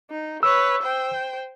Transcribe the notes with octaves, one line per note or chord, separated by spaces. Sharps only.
D#4
B4 C#5 E6
C5 G5